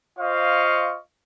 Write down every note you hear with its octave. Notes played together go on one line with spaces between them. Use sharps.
F4 C5 D#5 F5 C#6